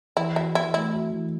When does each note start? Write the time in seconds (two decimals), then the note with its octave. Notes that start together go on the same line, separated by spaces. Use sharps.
0.17 E3 E4
0.36 E4 F#4
0.55 E3 E4
0.74 A3 E4
0.93 F#4
1.12 E3